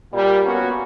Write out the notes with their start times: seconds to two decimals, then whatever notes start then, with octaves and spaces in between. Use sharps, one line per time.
0.12 A#2 G3
0.43 A#3 B3 C#4 F#4